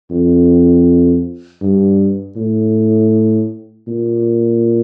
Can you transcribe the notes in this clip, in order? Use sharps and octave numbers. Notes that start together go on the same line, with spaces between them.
F2
G2
A2
A#2